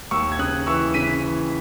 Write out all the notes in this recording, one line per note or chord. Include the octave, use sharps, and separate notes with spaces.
D#2 C#6 E6
G#6
C#3 D#6 F#6
E3 C#6 E6
C#3 B6 D#7
E3